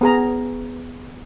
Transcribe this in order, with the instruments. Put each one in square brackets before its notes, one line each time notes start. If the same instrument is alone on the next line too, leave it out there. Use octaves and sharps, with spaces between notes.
[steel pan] B3 G#4 A#5